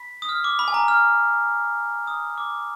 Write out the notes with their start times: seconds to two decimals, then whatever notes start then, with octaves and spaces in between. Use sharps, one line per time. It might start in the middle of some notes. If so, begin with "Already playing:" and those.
Already playing: B5 B6
0.22 D#6
0.29 F6
0.44 D6
0.59 B5
0.68 G#5
0.74 A#5
0.88 F6
2.07 D#6
2.38 D6